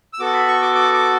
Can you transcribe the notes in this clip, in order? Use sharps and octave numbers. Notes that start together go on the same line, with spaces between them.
E6
B3 F#4 A4 D6
B5
C#6
D6
D6
D6